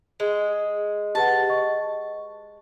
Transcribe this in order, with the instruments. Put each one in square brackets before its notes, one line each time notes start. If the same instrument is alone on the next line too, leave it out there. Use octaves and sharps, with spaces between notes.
[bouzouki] G#3
[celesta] G4 B4 F#5 [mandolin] A5
[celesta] D#5 C#6